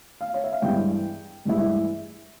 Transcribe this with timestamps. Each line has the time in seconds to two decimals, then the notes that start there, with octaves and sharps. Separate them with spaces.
0.21 F5
0.34 C#5
0.44 E5
0.53 F5
0.62 G2 E3 G#3 E4 G5
1.45 G2 E3 G#3 E4